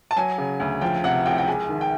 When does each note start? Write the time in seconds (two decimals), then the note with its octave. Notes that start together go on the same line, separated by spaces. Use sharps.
0.11 A5
0.16 F#3 G#5
0.38 C#3
0.60 D2
0.81 F3 G5
1.04 C3 F#5
1.26 C2 G5
1.38 G5
1.48 G#3 G#5
1.69 D#3
1.81 G5